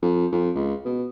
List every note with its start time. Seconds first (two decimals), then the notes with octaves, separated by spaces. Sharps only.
0.02 F2
0.32 F2
0.55 C#2
0.85 B2